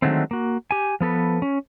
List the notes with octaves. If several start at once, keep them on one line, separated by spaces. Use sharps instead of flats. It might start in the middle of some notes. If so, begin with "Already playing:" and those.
D3 D#3 F#3 G#3 A3 C4
A#3 F#4
G4 G#5
F3 B3 A4 B4
C#4